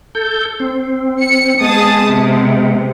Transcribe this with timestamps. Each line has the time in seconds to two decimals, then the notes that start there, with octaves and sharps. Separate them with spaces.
0.15 A4 G6
0.60 C4
1.21 C#7
1.61 G#3 B3 G#4 A5 D#6
2.06 C3